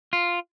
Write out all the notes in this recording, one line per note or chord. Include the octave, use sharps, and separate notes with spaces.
F4